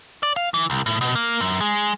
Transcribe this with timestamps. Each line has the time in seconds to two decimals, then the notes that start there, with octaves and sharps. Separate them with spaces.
0.23 D5
0.36 F5
0.54 E3
0.70 C2
0.86 A2
1.01 B2
1.15 A#3
1.41 F#2
1.61 G#3